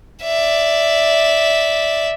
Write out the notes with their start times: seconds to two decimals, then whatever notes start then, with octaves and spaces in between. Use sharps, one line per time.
0.23 D5 E5